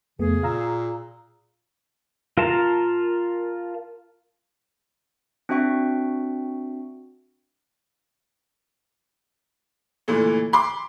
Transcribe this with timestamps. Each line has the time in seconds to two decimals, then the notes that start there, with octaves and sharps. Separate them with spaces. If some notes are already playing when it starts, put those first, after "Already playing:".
0.19 F2 C#3 A3 B3 G#4
0.43 A#2 F5 A#5 E6
2.38 F4 A#4 A5 A#5
5.49 C4 D4 F#4 E5 G5 C#6
10.08 A#2 D3 E3 A3
10.53 B5 C6 D6